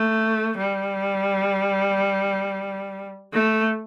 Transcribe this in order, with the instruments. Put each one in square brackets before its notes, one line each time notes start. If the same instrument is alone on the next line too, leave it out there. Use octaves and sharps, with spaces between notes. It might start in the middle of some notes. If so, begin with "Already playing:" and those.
Already playing: [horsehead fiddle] A3
G3
A3